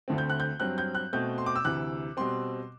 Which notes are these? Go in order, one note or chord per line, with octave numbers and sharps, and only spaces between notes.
D2 D3 A3 C4
G6
F#6
G6
G2 F#3 C4 F#6
G6
F#6
B2 A3 C4 G6
C6
D6
E6
D2 C3 E3 F#6
B2 G3 C4 C6